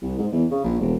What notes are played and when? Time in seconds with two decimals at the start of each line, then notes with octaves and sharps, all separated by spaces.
0.02 C2
0.18 G#2
0.32 E2
0.51 C#3
0.64 A#1
0.80 E1